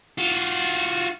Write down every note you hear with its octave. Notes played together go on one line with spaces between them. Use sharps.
F4 F#4